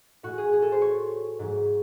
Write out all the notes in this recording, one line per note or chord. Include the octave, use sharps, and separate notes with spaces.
A2 G#3 F#4
G#4
G#4
A4
C5
C#5
G#2 F#3 A3